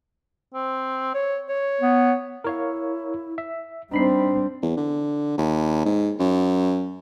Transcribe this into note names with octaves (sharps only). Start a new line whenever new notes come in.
C4
C#5
C#5
B3
E4 A#4 C#5 F5
E5
G3 C4 D4 D#4 B5 C7
E2
D3
D#2
G#2
F#2